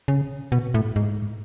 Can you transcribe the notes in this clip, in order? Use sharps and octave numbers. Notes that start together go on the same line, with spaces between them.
C#3
B2
A2
G#2